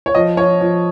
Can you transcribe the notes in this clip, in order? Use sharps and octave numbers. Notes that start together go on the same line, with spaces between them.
C#5
F3 D#5
F3 C#5
F3